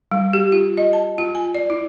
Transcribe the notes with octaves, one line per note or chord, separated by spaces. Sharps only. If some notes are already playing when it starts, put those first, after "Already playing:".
G3
G4
F4
D#5
A5
F4
G#5
D5
E4